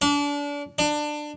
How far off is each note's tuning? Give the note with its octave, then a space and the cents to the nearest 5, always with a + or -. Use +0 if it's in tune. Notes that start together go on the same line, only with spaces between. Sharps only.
D4 -30
D4 +20